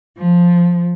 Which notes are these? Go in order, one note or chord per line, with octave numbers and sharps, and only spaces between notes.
F3